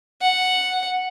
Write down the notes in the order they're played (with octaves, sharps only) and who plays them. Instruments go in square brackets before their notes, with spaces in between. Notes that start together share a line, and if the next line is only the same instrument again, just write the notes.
[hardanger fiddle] F#5